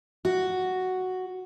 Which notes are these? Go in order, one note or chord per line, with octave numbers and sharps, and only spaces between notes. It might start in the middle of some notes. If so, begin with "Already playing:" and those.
F#4